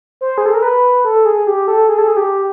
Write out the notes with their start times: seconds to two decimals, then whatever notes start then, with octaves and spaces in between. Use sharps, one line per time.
0.21 C5
0.38 G#4
0.46 A4
0.54 A#4
0.62 B4
1.05 A4
1.25 G#4
1.47 G4
1.68 A4
1.89 G#4
1.98 A4
2.08 G#4
2.17 G4